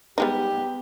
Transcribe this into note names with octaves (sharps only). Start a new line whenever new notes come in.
G3 G#3 B3 D#4 G4